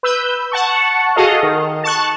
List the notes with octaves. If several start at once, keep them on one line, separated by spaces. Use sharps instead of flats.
B4 E6 G6
F#5 A5 C#6
F#4 G#4 A4 D#5 F5
D#3
A5 C#6 F#6